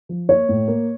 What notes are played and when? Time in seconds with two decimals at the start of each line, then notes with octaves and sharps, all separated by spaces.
0.09 F3
0.29 A#3 C#5
0.49 A2
0.68 A#3